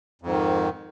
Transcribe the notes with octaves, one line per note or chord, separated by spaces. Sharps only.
F2 G#2 D#3